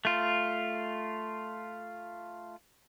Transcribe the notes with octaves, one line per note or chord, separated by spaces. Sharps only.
A3 F4